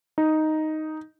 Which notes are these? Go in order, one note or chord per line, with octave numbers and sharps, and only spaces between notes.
D#4